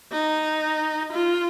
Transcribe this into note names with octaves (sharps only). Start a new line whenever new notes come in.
D#4
F4